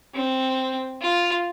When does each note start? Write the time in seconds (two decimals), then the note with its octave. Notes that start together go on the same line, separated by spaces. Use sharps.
0.14 C4
1.01 F4